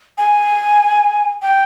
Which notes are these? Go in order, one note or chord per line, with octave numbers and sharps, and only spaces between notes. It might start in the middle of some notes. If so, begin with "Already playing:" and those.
G#5
G5